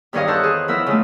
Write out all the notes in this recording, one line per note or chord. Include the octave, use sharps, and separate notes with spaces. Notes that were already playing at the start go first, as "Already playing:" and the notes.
E2 G2 D#3 C#5 D#5 F5
A4 C5 C#5 A5 F#6
G#4
F3 B3 E4 A#4 E5
C#3 G#3 A3